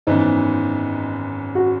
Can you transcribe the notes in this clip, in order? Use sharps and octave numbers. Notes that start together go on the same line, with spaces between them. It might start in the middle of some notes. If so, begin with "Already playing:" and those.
G#1 F#2 E3 B3 D#4
F#4